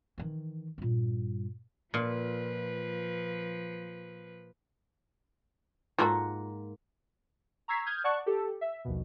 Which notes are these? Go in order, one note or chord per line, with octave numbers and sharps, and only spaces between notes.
D#3 E3
G2 A#2
A#2 F3 B4
G#2 A#3 F4 F#4 A4 F#5
A#5 C#6 E6 G#6 B6 C7
D#6 F6 G6 G#6
D5 F#5 A5 C#6 F#6
G4 A4
E5
A#1 D#2 B2